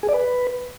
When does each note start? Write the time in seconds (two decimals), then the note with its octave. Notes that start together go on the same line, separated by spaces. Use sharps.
0.03 G#4
0.09 D5
0.14 B4